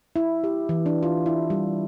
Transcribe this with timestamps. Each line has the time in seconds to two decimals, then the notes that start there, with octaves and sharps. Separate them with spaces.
0.16 E4
0.44 G4
0.69 E3
0.86 D4
1.03 F4
1.26 E4
1.50 G3